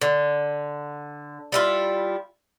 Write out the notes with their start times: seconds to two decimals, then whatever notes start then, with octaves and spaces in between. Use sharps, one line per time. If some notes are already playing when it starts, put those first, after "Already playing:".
0.01 D3
1.52 G3 E4 F4